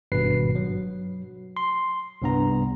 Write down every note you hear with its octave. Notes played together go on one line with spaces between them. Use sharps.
G#1 G2 B2 B4 C7
F#3
C6
C2 G2 B3 A#5